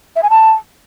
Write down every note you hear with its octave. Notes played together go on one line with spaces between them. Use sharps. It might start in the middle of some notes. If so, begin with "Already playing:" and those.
E5
G#5
A5